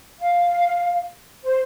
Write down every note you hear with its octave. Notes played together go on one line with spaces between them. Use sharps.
F5
C5